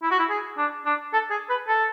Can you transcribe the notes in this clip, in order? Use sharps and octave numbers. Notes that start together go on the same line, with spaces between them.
E4
F#4
E4
G#4
D4
D4
A4
G#4
B4
A4